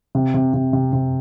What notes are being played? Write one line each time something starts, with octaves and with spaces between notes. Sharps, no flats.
C3
C3
C3
C3
C3